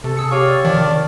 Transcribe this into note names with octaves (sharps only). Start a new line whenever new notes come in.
C3 A4
G#4 E6 C#7
G4 C#5 F5 C#6
D5
D#3 F3 D4
C#3